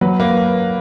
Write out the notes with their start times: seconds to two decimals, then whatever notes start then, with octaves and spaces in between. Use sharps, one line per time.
0.01 F#3 B4
0.20 A#3 B4